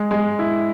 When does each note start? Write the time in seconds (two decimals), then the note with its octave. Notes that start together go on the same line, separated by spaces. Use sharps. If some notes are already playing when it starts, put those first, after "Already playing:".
Already playing: G#3
0.11 G#3
0.39 E4